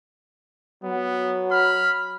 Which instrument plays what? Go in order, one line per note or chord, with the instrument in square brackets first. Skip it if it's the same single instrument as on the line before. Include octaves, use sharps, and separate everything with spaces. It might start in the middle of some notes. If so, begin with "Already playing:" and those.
[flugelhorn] F#3 [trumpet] B3
[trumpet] B5 [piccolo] F6